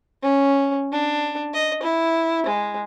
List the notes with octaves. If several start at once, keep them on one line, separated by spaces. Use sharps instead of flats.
C#4
D4
D#5
E4
G#3